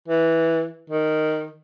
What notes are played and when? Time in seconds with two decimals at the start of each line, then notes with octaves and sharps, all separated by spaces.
0.08 E3
0.90 D#3